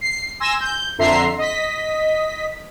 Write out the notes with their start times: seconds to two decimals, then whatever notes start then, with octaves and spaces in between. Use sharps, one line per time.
0.01 C7
0.40 G#5 C6 E6 A#6 E7
0.60 G6
0.98 F2 D3 E5 A#5 C6 C7
1.38 D#5 B6